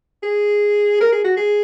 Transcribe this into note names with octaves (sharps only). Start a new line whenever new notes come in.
G#4
A#4
G#4
F#4
G#4